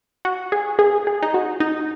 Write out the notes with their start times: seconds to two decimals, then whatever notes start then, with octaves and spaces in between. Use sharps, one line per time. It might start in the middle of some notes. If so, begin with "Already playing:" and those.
0.25 F#4
0.52 G#4
0.79 G#4
1.07 G#4
1.23 D#4
1.34 F#4
1.60 D#4